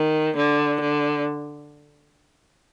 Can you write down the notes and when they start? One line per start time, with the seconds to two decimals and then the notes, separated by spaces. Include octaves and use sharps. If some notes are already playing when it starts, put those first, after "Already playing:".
Already playing: D#3
0.36 D3
0.81 D3